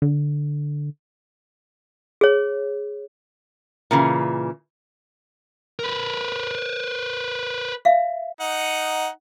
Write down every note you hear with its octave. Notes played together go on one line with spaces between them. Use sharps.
D3
G#4 C#5
A#2 C#3 E3
A#4 B4
E5 F5
D#4 F#5